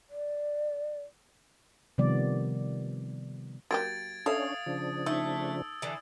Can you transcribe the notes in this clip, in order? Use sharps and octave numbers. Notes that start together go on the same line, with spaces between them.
D5
C3 D#3 F3 G3 B3 D5
F#3 A#3 G4 G#6 A6 D7
C#4 D4 A4 C#5 E5 F5 D#6
C#3 F3 D4
A3 D#4 E6
D3 E3 A5